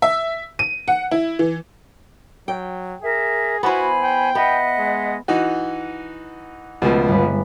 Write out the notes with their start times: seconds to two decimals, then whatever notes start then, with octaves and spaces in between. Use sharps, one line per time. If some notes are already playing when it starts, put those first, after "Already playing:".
0.02 E5
0.59 D#7
0.88 F#5
1.11 E4
1.39 E3
2.48 F#3 G5
3.02 G#4 A#4 E5
3.63 B3 E4 F#4 C5 G#5 B5
4.03 G5
4.35 B3 D#5 E5 F#5
4.78 G#3
5.28 E3 D#4 F#4
6.82 C#2 B2 F3 A3
7.08 G1 B5